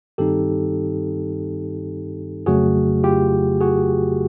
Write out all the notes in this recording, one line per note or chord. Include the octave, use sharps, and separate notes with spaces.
G2 D#3 G3 C4 D#4 G4 A4
F2 C#3 F#3 A3 F#4 G#4
F4 G4
F#4 G#4